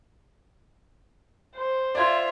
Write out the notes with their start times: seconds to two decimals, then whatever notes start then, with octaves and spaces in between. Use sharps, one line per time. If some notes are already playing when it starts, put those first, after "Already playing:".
1.55 C5
1.95 F4 D5 E5 G#6